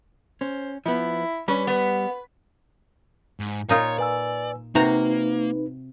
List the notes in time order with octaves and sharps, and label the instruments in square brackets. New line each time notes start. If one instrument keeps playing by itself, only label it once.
[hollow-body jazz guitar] C#4 [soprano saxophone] C5
[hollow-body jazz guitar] F3 B3 [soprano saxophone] E4
[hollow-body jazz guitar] G3 [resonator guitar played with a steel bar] C#4 [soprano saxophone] B4
[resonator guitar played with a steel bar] B3
[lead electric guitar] G#2
[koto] A#2 D#4 F4 [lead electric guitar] C#5
[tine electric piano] B4 G#5 E6 [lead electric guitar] D5
[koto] C3 F#4 A#5 [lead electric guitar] A#3 [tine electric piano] D#4 B4